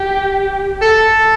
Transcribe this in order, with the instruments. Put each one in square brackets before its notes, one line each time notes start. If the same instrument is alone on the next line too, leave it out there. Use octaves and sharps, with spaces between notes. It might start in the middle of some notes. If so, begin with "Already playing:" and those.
Already playing: [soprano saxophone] G4
A4